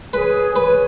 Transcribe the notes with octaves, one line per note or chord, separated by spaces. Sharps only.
G#4 B4 C#5 G#5
G#4 B4 C#5 G#5